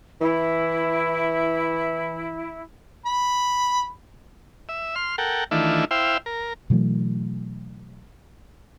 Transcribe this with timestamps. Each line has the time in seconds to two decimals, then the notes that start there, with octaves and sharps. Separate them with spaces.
0.21 E3 E4
3.06 B5
4.69 E5
4.96 C6 F6
5.18 A4 A#4 F#5 G5
5.51 D#3 E3 A3 D4 E4 F4
5.91 E4 C5 E5 F5 G5
6.26 A#4
6.70 B2 E3 F#3 A3